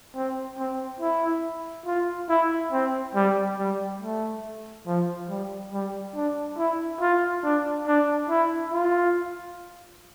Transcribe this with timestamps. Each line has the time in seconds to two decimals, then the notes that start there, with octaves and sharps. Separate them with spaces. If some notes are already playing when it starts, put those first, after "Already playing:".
0.16 C4
0.58 C4
1.00 E4
1.86 F4
2.29 E4
2.72 C4
3.15 G3
3.58 G3
4.01 A3
4.87 F3
5.29 G3
5.72 G3
6.15 D4
6.58 E4
7.01 F4
7.44 D4
7.87 D4
8.29 E4
8.72 F4